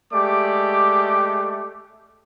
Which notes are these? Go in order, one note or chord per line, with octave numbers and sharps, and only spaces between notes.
G#3 A3 G4 D5 D6